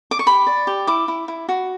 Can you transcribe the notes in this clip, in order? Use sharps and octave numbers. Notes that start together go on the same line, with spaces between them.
D6
C#6
G4 B5
D5
G4
E4 D6
E4
E4
F#4